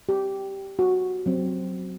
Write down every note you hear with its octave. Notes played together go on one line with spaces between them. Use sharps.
G4
F#4
F#3 C4